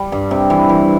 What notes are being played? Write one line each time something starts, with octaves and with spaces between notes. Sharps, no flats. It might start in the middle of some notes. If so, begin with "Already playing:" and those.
Already playing: G3
G2
C3
E3
E3